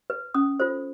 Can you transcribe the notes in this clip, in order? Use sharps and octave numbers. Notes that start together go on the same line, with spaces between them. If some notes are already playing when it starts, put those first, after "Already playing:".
B4
C#4 D#6
F4 A4 C5